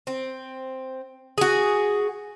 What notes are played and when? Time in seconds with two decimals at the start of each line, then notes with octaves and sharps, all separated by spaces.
0.07 C4
1.38 F#4 G#4